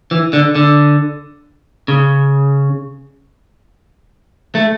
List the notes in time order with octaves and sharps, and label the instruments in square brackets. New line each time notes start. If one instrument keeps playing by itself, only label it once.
[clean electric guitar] E3
D3
D3
C#3
A3